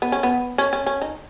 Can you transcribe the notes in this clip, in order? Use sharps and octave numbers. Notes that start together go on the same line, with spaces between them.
B3
C#4
B3
C#4
C#4
C#4
D#4